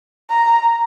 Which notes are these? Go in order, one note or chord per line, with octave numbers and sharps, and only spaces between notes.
A#5